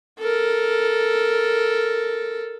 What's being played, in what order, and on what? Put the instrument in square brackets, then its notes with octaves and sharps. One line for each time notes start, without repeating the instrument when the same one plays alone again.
[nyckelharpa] A4 A#4